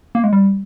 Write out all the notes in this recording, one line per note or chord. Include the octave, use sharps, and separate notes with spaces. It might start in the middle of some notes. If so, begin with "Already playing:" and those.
A#3
G#3
G3